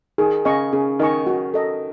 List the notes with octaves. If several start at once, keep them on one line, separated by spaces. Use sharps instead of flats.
D#3 G#4
C#3 D#5 G#5 C#6
C#3 G#4
D#3 D#5 G#5 C#6
F#4
A4 D#5